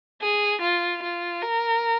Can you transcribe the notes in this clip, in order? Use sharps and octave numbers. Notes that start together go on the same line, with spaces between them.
G#4
F4
F4
A#4